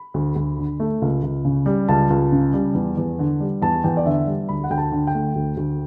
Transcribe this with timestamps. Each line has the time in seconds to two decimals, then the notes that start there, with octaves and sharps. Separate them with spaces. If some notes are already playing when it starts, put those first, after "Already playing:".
Already playing: B5
0.14 D2
0.36 D2
0.58 D3
0.80 A3
1.02 C#2
1.23 C#2
1.45 C#3
1.66 G3
1.89 C#2 A5
2.10 C#2
2.32 C#3
2.53 G3
2.74 E2
2.97 E2
3.19 D3
3.40 G3
3.62 E2 A5
3.84 E2 G5
3.97 D5
4.05 D3 E5
4.27 G3
4.49 D2 B5
4.64 F#5
4.70 D2 G5
4.78 A5
4.92 D3
5.07 G5
5.14 A3
5.36 D2
5.57 D2